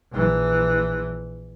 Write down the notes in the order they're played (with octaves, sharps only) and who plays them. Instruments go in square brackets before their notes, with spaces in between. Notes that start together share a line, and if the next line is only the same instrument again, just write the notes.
[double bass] A#1 E3